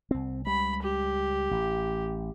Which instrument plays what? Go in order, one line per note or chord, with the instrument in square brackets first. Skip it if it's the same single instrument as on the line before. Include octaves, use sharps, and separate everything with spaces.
[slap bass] C2 C4
[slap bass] C#2 G3 [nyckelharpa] B5
[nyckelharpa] G4
[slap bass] A1